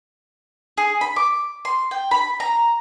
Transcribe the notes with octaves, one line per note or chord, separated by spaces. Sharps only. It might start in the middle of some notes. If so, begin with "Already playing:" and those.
G#4
B5
D6
C6
G5
B5
A#5